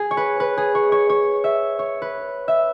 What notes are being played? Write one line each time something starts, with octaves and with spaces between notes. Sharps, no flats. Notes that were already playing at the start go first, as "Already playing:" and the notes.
Already playing: G#4
C#5
B4
B4
G#4
C#5
C#5
C#5
E5
C#5
B4
E5